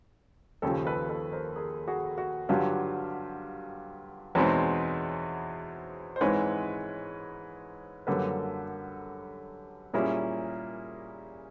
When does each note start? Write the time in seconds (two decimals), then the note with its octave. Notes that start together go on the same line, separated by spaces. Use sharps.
0.62 D#2 C#3 F3 G4 A4
0.85 A4 B4
1.09 A4 B4
1.32 A#4 C5
1.56 G#4 A#4
1.87 F#4 G#4
2.18 F#4
2.49 G2 D3 F#3 F4 G4
4.35 E2 B2 G#3 C4 D#4 B4 C#5
6.16 C5
6.21 G#2 E3 G#3 C4 D#4 B4 C#5
8.07 F#2 D3 G3 A#3 A4 B4
9.94 A#2 G3 A#3 C#4 E4 G#4 A#4